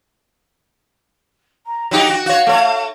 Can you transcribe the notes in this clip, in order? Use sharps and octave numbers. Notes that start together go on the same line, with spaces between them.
A#5
F#3 D#4 G4 G5
F#4
F#4 C#5 F5
A3 C#5